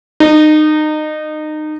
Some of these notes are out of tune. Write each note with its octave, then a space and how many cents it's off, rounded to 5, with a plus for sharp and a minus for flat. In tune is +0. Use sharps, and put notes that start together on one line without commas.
D#4 -25